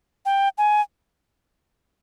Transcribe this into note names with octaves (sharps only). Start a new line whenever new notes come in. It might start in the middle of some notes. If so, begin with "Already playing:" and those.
G5
G#5